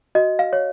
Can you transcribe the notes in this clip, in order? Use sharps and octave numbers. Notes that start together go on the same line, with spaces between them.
F#4 D#5
F5
C#5